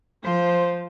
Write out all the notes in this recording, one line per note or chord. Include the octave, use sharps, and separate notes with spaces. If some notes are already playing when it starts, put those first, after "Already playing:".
F3 C5